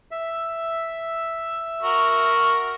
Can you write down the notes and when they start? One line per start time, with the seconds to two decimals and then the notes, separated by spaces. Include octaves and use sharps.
0.11 E5
1.82 F#4 A#4